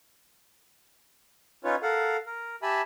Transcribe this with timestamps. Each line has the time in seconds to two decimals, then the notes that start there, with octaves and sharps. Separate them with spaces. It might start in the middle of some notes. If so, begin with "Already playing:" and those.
1.64 C#4 D#4 F4 B4 C#5
1.82 A4 A#4 F5 F#5
2.26 A#4
2.63 G4 E5 G#5 A5 B5